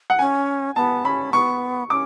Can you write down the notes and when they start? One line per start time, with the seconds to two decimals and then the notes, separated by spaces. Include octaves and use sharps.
0.10 F#5
0.19 C#4 G#5
0.76 B3 A5
1.05 C#4 B5
1.32 B3 C#6
1.90 C#4 D6